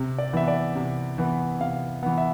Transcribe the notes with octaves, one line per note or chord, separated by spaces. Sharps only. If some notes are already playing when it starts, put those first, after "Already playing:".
Already playing: C3
D5
E3 B3 E5
D5
C3
E3 B3
C3 F5
E3 B3
E5